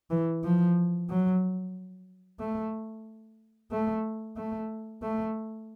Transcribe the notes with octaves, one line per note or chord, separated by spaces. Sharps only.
E3
F3
F#3
A3
A3
A3
A3